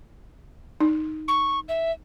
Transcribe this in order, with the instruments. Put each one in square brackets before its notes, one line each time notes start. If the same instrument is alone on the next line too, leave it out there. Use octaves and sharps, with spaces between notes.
[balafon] D#4
[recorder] C#6
E5